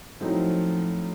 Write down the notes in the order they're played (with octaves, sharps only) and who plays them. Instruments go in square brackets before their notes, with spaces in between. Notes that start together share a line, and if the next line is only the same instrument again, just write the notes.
[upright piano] A2 F#3 A3 C4 D#4 [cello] F3